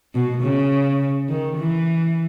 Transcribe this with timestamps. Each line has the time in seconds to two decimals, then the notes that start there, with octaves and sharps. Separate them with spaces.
0.14 B2
0.43 C#3
1.29 D#3
1.57 E3